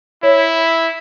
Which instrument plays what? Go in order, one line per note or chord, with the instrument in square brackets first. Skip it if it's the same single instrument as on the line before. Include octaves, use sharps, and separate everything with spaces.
[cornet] E4 [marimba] C#5